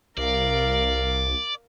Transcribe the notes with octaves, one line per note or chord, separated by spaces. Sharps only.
C2 A#4 D5 F5